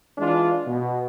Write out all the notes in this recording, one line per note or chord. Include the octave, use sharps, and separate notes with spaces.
E3 G#3 D4 F4
B2